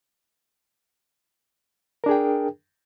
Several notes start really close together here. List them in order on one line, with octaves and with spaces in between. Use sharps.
A#4 D4 G#4 G5